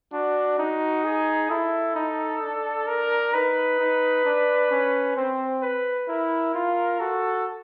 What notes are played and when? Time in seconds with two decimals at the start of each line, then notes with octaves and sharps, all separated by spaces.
0.12 D4 F#4
0.59 D#4
1.04 G#4
1.50 E4 A4
1.95 D#4
2.42 D4
2.87 A#4
3.33 D#4 B4
3.79 D#4
4.25 D4
4.71 C#4
5.16 C4 C5
5.62 B4
6.08 E4 A#4
6.54 F4
7.00 F#4 A4